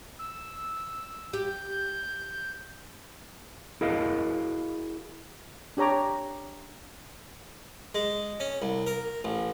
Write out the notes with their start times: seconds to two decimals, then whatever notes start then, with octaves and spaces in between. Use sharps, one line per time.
0.19 E6
1.33 G4 G6
3.81 E4 F#4 G#4 A#4 D#5 F5
5.77 D4 G4 C#5 A#5 D6
7.95 G#3
8.40 C#4
8.62 C2
8.87 A#4
9.24 A1